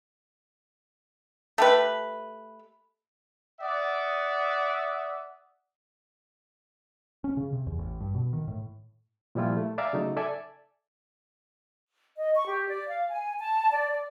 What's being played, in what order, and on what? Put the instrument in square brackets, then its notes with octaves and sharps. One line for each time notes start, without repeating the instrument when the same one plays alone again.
[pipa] A3 G4 B4
[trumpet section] D5 E5 F#5 D#6
[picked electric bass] C#4
C#3
C3
E2
A1
G2
B2
D#3
A2
[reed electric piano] A#2 F3 G3 E4 F4
A3
D5 E5 F5 G#5 A#5
C#3 F#3 A3 D#4
A4 D5 E5 G#5
[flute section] D#5
C#6
G4
D5
F5
G#5
A5
D5
D5